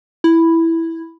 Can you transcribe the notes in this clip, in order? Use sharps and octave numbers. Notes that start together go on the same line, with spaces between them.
E4